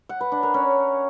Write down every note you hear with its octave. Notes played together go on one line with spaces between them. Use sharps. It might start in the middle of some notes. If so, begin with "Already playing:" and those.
F#5
B4
D4
A#4
C#4